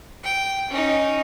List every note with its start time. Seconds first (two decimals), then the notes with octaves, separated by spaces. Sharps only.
0.24 G5
0.70 C#4 D#4